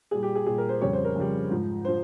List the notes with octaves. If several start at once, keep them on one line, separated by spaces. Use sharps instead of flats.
A#2 G3 G#4
G4
G#4
A#2 G3 G#4
A#4
C5
F2 C#3 G3 C#5
C5
A#4
F2 C#3 G3
G#2 F3
F3 C5